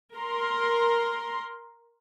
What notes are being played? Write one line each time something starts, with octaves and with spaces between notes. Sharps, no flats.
A#4 C6